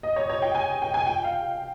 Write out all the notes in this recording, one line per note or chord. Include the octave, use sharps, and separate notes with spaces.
D#5
C#5
C#5
G5
G#5
G5
G#5
G5
F5